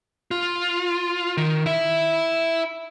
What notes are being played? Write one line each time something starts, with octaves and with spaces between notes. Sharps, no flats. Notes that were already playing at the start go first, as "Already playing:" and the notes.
F4
D#3
E4 E5